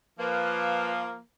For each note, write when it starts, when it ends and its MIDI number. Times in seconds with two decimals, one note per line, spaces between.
0.19 1.18 53
0.19 1.18 58
0.19 0.92 71